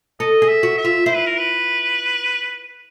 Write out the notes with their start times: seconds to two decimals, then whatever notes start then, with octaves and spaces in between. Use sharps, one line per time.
0.20 A4 D#5
0.42 G#4
0.48 E5
0.63 F#4
0.78 E5
0.85 F4
1.06 E4 C5
1.16 B4
1.26 A#4
1.37 B4